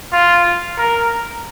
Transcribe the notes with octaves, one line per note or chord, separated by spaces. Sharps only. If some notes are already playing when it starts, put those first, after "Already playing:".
F4
A#4